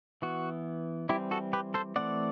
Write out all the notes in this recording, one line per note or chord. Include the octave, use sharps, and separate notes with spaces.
E3 B3 F#4
E3 G3 C4 E4 G4
F#4 A4
G4 B4
A4 C5
E3 A3 C4 D5 F#5